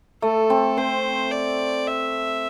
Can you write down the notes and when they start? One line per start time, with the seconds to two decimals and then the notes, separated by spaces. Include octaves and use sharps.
0.22 A3 A4
0.50 C4
0.77 C4 C5
1.31 D5
1.87 E5